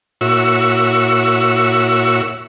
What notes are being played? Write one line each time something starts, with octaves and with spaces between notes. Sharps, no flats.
A#2 E4 F#4 C#5 E6